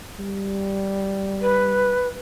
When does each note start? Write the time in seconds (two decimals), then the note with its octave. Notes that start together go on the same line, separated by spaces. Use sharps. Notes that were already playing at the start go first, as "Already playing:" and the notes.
0.19 G3
1.41 B4